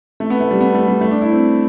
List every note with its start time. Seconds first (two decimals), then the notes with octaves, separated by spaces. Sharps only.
0.20 A3
0.30 B3
0.40 A3
0.51 G3
0.61 B3
0.74 A3
0.88 G3
1.01 A3
1.11 D4
1.21 E4
1.31 C4